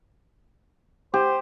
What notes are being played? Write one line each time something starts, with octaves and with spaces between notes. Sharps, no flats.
G4 C5